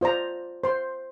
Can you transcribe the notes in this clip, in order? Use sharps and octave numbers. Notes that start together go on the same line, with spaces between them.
F4 C5 D5 A#5
C5 C6